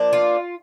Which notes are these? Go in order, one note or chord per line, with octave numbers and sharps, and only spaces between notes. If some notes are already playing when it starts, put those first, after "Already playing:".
Already playing: F3 A#3 D4
F4